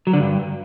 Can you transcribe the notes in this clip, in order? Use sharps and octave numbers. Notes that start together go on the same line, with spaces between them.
F#3
D3
G2